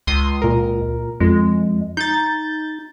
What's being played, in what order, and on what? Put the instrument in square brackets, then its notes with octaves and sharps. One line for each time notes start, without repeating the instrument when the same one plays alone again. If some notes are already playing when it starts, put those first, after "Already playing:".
[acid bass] C#2 [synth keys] C6 D#6
[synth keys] A#2 A#4
[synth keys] F2 [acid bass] G#3
[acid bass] D#4 [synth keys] G6 A6